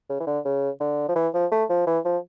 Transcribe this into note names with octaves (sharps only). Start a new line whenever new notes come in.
C#3
E3
D3
C#3
D3
F3
E3
F3
A3
F3
E3
F3